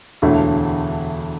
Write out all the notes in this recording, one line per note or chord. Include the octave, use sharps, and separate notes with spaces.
E1 D2 D3 A3